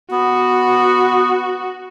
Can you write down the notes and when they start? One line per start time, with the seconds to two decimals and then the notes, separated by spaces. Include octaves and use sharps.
0.11 B3 F#4